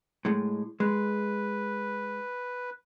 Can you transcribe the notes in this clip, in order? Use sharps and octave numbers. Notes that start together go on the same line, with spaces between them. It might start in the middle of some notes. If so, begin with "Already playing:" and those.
A2 G#3
G#3 B4